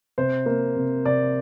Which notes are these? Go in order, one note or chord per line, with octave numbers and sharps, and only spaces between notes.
C3 C5
A#3
C3
C3 D5